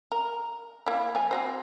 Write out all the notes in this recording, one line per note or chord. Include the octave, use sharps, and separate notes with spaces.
A#4
A#3 E4
F3 G#5
C4 F#4 C5